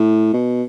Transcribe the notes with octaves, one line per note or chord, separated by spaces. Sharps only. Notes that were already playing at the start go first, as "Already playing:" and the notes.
Already playing: A2
B2